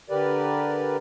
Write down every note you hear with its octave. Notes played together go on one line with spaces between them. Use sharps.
D3 G4 A#4 B4 D5